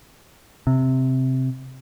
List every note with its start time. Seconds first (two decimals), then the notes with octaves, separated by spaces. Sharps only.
0.67 C3